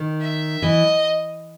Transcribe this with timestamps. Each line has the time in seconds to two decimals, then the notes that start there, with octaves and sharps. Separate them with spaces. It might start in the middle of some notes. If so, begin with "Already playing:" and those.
Already playing: D#3
0.21 E5
0.62 E3 D#5